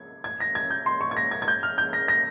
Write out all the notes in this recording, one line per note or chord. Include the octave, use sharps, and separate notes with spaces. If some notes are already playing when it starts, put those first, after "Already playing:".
Already playing: G#6
G#6
A#6
G#6
G6
C6
C#6
G#6
A#6
G#6
G#6
G6
F6
G6
A#6
A#6